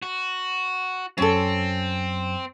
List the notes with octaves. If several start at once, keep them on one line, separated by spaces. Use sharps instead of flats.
F#4
F#2 F#3 C4 C#4 A4